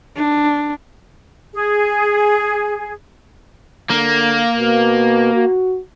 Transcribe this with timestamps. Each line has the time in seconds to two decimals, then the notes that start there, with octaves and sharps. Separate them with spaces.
0.16 D4
1.53 G#4
3.90 D3 A#3
4.57 B2
5.34 F#4